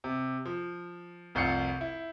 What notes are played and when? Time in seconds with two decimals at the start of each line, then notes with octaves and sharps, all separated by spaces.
0.04 C3
0.46 F3
1.35 F1 C2 F4 G6 C7 C#7
1.81 E4